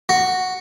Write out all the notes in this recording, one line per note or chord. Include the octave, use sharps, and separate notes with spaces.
F#4